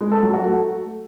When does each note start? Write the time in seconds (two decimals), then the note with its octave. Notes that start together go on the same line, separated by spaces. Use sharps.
0.01 G#3
0.12 A4
0.23 F#3
0.34 F#4
0.45 A3